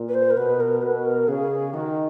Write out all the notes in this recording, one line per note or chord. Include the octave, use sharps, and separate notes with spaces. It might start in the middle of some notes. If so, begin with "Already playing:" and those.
Already playing: A#2
B4
C5
A#4
B2 B4
A#4
B2 B4
A#4
C#3 G#4
D#3 F#4